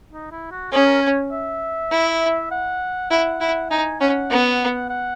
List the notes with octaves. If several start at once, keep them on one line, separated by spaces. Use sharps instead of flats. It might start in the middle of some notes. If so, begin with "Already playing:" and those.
D#4
E4
F#4
C#4 G#4
A#4
C#5
E5
E4
F#5
E4 F#5
E4
D#4 G#5
C#4 F#5
B3
F#5